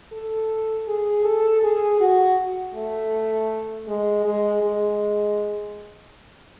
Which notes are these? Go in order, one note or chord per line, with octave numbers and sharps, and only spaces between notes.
A4
G#4
A4
G#4
F#4
A3
G#3
G#3
G#3